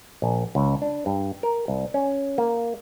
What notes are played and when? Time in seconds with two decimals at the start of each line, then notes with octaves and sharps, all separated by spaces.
0.22 A#1
0.55 C#2
0.82 D4
1.06 G2
1.43 A#4
1.68 C2
1.94 C#4
2.38 A#3